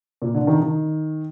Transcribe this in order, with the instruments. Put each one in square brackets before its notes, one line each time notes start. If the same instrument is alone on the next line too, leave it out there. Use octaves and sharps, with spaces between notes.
[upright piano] A#2
D3
D#3
D#3